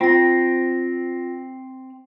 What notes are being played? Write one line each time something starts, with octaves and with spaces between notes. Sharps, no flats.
C4 F4 A#6